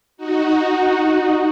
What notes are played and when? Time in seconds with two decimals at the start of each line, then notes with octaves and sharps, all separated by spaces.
0.17 D#4 F#4
0.58 D#4 F#4